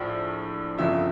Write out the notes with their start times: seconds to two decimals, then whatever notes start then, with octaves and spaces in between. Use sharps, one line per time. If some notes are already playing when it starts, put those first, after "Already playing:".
Already playing: A#1 A2 F3
0.78 G1 F2 C#3 F3 E5